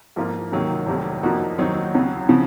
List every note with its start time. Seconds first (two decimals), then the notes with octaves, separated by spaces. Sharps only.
0.16 G#2 F3 A#3 F4
0.52 C#2 C3 D#3 F#3 A#3
0.87 F1 F2 C3 D#3 F#3
1.23 F#2 F3 A#3 D#4 F#4
1.58 D#2 D#3 F#3 C4 D#4
1.94 C#2 C#3 F#3
2.29 C#3 F3